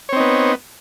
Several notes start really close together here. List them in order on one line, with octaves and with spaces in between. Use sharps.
C#5 C4 D#4 B3